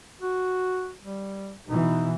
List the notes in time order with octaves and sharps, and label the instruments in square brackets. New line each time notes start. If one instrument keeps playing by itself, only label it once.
[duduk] F#4
G3
[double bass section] B2 E3 [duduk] D#4